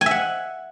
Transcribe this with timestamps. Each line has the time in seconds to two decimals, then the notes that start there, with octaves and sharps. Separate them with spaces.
0.01 G#5
0.06 E5
0.11 F#5